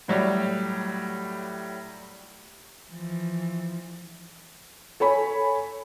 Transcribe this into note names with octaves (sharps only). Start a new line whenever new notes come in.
A2 F#3 G3
E3 F3
A4 C#5 G#5 B5